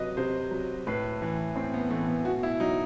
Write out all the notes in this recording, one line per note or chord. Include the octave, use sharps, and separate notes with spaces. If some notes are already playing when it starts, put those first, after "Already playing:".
Already playing: C3 F#3 B4 D#5
C3 C5
F#3
A2 B4
E3
A2 C4
B3
E3 A3
B3
B2 F#4
E4
F#3 D#4